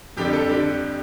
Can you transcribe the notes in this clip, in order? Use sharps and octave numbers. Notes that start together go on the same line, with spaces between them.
F2 D3 G3 G4
A4
D3 G3 G4